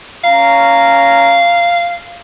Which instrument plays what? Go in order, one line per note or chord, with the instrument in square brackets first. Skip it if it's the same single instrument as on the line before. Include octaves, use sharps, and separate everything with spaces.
[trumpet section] C#4 A#5 [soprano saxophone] F5